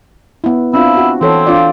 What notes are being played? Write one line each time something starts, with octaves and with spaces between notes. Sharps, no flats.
B3 E4
C4 D4 E4 F4
F#4
E3 C4 A4 C#5
D4 F4 D5